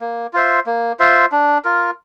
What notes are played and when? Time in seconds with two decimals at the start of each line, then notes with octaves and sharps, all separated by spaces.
0.01 A#3
0.33 F4 C5 E5
0.66 A#3
0.99 F4 C5 E5
1.32 D4
1.64 F4 A#4